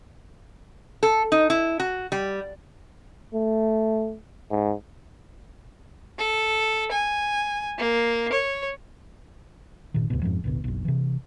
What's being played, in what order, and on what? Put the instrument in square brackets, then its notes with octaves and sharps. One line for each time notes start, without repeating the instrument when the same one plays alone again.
[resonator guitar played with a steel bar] A4
D#4
E4
F#4
G3
[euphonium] A3
G#2
[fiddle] A4
G#5
A#3
C#5
[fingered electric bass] G1 A#2 D#3
D2 G2 B2
F2 G#2 F3
A1 D2 B2
F#1 B1
C3 E3